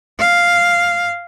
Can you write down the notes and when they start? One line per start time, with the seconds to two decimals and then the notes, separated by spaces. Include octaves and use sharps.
0.19 F5